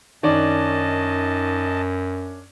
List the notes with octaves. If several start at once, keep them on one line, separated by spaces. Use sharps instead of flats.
F#2 D#3 C#4 D4 D5 D#5 A5